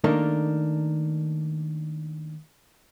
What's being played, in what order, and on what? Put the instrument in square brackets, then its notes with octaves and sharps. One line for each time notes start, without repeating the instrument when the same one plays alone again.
[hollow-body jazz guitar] D#3 A3 A#3 D4 D#4 A#4